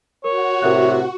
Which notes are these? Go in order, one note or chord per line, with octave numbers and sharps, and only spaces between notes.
F#4 A#4 C#5
A2 C3 A#4 E5 F#6